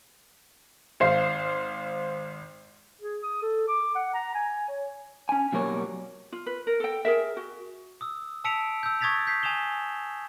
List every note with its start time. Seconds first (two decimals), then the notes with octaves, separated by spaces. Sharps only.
1.00 G#1 C5 F5 C7
3.01 G#4
3.23 D#6
3.42 A4
3.68 D6
3.95 F#5
4.15 A#5
4.35 G#5
4.69 C#5
5.29 C#4 G#5
5.52 B2 F#3 G3 A#3 A#4 C#5
6.32 F4
6.46 B4
6.67 A#4
6.80 A4 G5
7.05 G#4 A#4 E5
7.37 F#4
8.01 D#6 E6
8.44 A5 E6 B6 C#7 D7 F7
8.83 E6 G6
9.01 C#6 D#6 G#6 A6 B6 F7
9.27 G6 B6 C7
9.43 G#5 D#6 E7 F7 G7